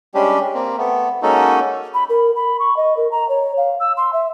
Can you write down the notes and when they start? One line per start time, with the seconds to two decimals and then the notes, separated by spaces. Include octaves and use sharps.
0.15 G3 G#3 C#4 D4 G4
0.54 A#3 C4
0.78 A3 B3
1.23 G#3 A#3 C#4 D#4 F#4 A4
1.94 B5
2.09 A#4
2.36 B5
2.60 C#6
2.77 D#5
2.97 A#4
3.11 A#5
3.29 C#5
3.57 F5
3.80 E6
3.97 C6
4.13 E5